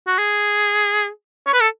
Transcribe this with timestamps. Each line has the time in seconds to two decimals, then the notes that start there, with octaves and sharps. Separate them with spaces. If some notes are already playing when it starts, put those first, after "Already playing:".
0.07 F#4
0.18 G#4
1.47 C#5
1.53 B4
1.61 A4